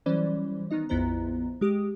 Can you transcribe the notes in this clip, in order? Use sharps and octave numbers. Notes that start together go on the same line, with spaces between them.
E3 F#3 G3 C#4 C5 D5
D#3 B3 D#4 D#5
A#1 F2 B3 E4 C5 A#5
G#3 G4 D#6